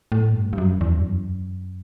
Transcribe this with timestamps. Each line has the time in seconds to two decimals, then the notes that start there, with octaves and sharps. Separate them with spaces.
0.12 A2
0.35 G2
0.53 G2
0.58 F#2
0.81 E2
0.98 G2
1.04 F#2